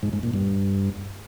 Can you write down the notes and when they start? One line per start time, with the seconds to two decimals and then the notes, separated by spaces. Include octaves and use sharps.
0.03 G#2
0.13 G#2
0.23 A#2
0.34 G2